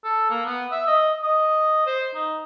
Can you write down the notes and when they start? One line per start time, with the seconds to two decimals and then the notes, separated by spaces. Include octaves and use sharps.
0.04 A4
0.31 A#3
0.46 B3
0.71 E5
0.87 D#5
1.23 D#5
1.86 C5
2.14 D#4